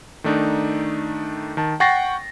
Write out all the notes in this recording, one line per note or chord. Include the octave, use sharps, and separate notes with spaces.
D#3 A3 D4 D#4
D#3 A5
F#5 G5 C#6 A6 A#6 C7